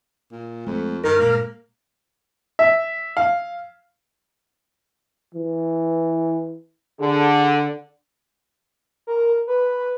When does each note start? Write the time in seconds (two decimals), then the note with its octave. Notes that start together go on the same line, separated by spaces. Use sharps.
0.31 A#2
0.67 F2 G#3 A3
1.04 G2 D#3 A#4
1.20 G2 A#2 G#3 A#3
2.59 E5
3.17 F5
5.35 E3
7.00 D3 G#4
9.07 A#4
9.47 B4